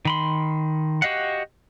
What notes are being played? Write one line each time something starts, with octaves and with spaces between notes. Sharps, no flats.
D#3 B5 C6
F#4 G4 D#5 F5 F#5